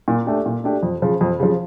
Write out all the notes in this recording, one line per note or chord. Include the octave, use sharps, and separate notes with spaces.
A#2
A3 D4 G4
A#2
A3 D4 G4
F2
C#3 F3
F2
C#3 F3